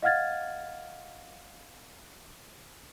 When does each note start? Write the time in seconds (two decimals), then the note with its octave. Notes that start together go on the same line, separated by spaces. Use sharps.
0.02 D#5 F5 F#5 F6 G#6 A6